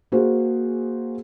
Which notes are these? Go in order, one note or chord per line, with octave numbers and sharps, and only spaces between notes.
A#3 F#4 G#4 C5